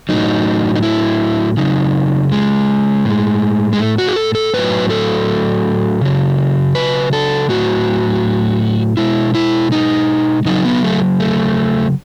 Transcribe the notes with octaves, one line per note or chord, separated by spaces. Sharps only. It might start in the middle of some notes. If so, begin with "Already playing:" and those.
A2 F#3 D#4
D#4
E4
C#3 F#3 D#4
G#3
A2 G#3
G#3
A3
F#4
G#4
A4
A4
A2 F#3 B4
A4
C#3 F#3
B4
A4
A2 F#3 F#4
B2 G#3 E4
E4
D#4
C#3 F#3 D#4
B3
A3
A3